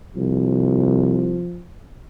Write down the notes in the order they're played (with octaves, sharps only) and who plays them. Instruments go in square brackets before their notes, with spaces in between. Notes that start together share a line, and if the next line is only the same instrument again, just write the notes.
[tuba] C2 [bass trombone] F3